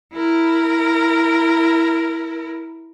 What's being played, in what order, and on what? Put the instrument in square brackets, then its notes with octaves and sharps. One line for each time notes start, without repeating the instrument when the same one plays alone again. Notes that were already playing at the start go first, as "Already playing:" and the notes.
[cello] E4 A#4